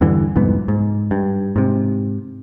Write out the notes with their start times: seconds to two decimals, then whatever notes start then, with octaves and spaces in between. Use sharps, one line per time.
0.01 E2 G2 D3 E3
0.36 C2 F2 G#2 B3
0.68 G#2
1.11 G2
1.56 G#2 C3